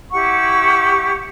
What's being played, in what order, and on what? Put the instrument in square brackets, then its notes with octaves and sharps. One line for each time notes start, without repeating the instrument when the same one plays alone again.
[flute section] E4 G4 F#5 C#6